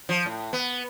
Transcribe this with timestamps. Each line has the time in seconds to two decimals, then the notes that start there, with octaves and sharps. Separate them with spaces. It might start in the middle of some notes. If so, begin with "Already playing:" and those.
0.09 F3
0.26 A2
0.53 B3